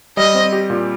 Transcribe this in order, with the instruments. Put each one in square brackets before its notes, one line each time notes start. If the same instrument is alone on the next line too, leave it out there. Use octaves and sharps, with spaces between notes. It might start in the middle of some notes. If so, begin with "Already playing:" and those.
[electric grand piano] G3 [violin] D#5
[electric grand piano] C4
G4
A#2